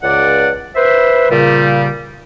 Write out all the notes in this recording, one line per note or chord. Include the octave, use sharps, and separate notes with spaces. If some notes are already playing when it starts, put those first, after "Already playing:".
C#2 D5 F#5
B4 C5 E5
A#2 C#3 G3